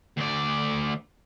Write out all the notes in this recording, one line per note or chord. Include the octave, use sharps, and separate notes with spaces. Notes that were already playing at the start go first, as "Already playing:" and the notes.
D2 D5